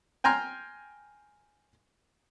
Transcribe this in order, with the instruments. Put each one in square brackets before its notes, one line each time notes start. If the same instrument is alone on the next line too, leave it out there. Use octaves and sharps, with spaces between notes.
[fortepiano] G5 G#5 A#5 C6 F6